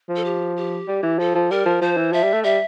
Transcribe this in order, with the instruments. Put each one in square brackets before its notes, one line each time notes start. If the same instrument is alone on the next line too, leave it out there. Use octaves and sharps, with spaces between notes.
[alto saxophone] F3
[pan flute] A4
G4
G4
[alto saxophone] G3
E3
[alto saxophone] F3 [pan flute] A4
[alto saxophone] F3
[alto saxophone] G3 [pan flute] A#4
[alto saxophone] F3
[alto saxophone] F3 [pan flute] C5
[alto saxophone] E3
[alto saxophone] F3 [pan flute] E5
[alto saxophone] G3
A3
[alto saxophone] G3 [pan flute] E5